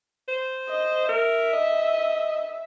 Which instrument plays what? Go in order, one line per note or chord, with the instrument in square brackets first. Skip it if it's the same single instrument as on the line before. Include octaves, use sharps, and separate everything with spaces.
[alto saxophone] C5
[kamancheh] D#5
[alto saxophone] A#4 [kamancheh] E5
[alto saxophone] D#5